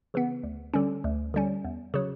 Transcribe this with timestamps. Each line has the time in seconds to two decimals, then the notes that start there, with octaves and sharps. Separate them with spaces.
0.14 C#3 E3 B3
0.43 D2
0.74 D3 G3 C#4
1.04 D2
1.34 D3 G3 C#4
1.65 E2
1.94 C#3 F#3